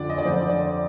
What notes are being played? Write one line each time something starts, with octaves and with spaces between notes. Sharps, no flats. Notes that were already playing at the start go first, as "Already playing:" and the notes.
Already playing: F2 D3 F3 D5
D#5
D5
F2 D3 F3 C5
D5